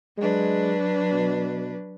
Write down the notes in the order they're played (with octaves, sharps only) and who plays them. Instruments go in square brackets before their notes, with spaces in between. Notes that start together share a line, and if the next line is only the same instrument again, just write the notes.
[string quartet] F#3 D4 B4 [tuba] G#3
[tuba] B2